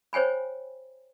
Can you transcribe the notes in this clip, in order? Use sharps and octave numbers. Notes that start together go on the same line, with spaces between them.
C5 C#5 G5 G#5 B5